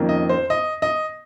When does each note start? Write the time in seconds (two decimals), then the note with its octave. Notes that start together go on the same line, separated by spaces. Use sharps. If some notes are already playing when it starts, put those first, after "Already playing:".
Already playing: F2 D#3 A#3 C#4
0.09 D#5
0.29 C5
0.50 D#5
0.82 D#5